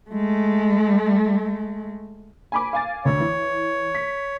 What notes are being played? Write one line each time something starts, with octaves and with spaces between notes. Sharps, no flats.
G#3 A3
G#5 B5 D6
F5 G#5 A6
D2 D3 C#5
E3
B6